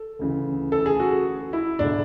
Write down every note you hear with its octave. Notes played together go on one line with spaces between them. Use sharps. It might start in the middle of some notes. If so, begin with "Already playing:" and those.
Already playing: A4
D2 C#3 E3
A4
G#4
F#4
E4
E1 D3 D4